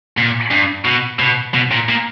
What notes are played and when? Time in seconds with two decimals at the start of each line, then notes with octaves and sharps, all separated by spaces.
0.17 A#2
0.50 G2
0.85 B2
1.19 B2
1.54 B2
1.71 A#2
1.89 A#2